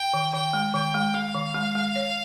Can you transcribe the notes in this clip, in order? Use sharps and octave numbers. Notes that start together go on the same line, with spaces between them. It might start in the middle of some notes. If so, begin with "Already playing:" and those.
Already playing: G5
D#3
D#3 G5
G#3
D#3 G5
G#3
G#3 F5
D#3
G#3
G#3
C#5